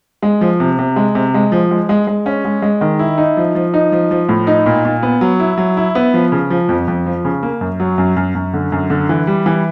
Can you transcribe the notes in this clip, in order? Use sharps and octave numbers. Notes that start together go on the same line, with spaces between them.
G#3
F3
C3
C3
G#3
C3
G#3
F3
G#3
G#3
G#3
C#4
G#3
G#3
D#3
E4
D#4
F3
F3
D#4
F3
F3
A2
D#4
A#2
A#2
B3
F#3
E4
F#3
E4
B3
F3
C#3
F3
F2
F2
F3
C#3
A#3
F#2
F#3
F#2
F#2
F#2
D3
F#2
D3
E3
G3
E3